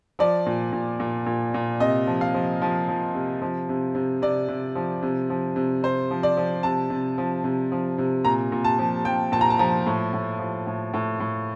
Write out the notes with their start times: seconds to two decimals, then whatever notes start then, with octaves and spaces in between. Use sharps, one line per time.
0.19 F3 D5
0.46 A#2
0.73 A#2
1.00 A#2
1.26 A#2
1.54 A#2
1.80 C3 D#5
2.07 F3
2.21 F5
2.34 F3
2.62 F3
2.88 F3
3.14 C3
3.42 F3
3.69 C3
3.95 C3
4.22 C3 D5
4.48 C3
4.75 F3
5.02 C3
5.30 F3
5.56 C3
5.83 C3 C5
6.11 F3
6.23 D5
6.37 F3
6.63 C3 A5
6.90 C3
7.18 F3
7.44 C3
7.72 F3
7.98 C3
8.25 A#2 A#5
8.52 A#2
8.64 A5
8.79 F3
9.05 F3 G5
9.32 A#2 A5
9.41 A#5
9.50 A5
9.59 F3 A#5
9.86 A2
10.13 A2
10.39 F3
10.67 A2
10.94 A2
11.20 A2